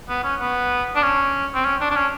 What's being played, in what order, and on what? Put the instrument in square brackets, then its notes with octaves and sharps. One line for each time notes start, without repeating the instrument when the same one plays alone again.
[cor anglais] B3
C#4
B3
D4
C#4
C4
C#4
D4
D4
C#4